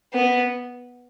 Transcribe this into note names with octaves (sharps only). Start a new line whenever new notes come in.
B3